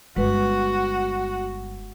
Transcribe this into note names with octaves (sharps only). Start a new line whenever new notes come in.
G1 G#3 F#4 B4